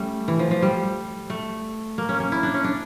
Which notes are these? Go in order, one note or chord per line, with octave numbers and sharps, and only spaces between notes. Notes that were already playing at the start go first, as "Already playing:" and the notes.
Already playing: G3 A3 C#4
E3
F3
F3
G3
A3
A#3
C#4
C#4
E4
D4
C#4
D4